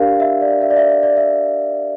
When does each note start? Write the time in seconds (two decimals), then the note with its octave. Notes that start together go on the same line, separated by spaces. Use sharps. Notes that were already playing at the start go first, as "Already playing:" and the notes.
Already playing: D4 G4 A#4 D5 F5
0.20 E5
0.41 D5
0.62 E5
0.70 D5
0.76 E5
0.90 E5
1.03 D5
1.17 E5